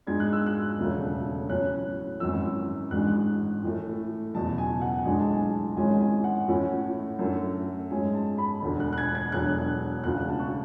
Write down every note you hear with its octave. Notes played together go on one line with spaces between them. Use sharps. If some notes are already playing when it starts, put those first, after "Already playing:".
G#2 G#3 D4 G#6
F#6
E6
F#6
E1 D2 C#3 F#3 A3
A2 F#3 C#4 F#6
G#1 F#2 E3 E6
A1 G#2 G#3 D4 F#6
A2 E3 A3
F#1 E2 B2 A5
G#5
F#5
B1 A2 E3 G#3 D4 G#5
A5
G#5
G#1 G#2 E3 G#3 C#4 G#5
G#5
F#5
A2 E3 A3 C#4 E4
F#2 D3 A3
G#2 G#3 C#4 G#5
A5
B5
E1 D2 D3
F#6
F#6
G#6
G#6
E1 E2 D3 F#3 F#6
E1 D2 C#3 E3 F#6
A5
C#6